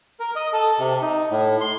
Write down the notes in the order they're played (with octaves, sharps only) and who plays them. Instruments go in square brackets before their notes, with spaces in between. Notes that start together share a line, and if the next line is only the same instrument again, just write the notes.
[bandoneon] A#4
D#5
A4
C3
D#4
A2
C6